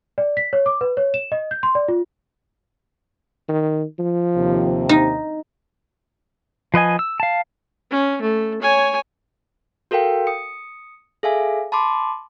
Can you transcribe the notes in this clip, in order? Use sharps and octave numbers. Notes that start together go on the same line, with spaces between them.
D5
B6
C#5
D6
B4
C#5
E7
D#5
G6
C6
D5
F4
D#3
F3
D#2 C3
D#4
F3 B4 D#5 G#5
E6
F5 A5
C#4
A3
C#5 G#5
F#4 A4 A#4 F5 G5
D#6 C#7
G#4 A4 E5 F5 G#5
A5 B5 C6 D6